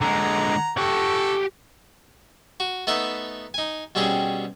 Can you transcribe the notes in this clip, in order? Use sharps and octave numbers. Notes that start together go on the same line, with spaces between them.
D3 G#3 F#5 A#5
G4 A4 F#5 C#6
F#4
A3 B3 D#4 B4 E5 A5
D#4 G#5
B2 G3 C4 C#4 G#4